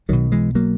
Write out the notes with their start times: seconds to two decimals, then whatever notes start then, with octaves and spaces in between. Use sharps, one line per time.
0.09 B1 B2 D#3 F#3
0.32 E3 G#3
0.55 F#3 A#3